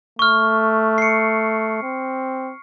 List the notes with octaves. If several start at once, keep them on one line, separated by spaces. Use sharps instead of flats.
A3 C#6 F6
C7 C#7
C4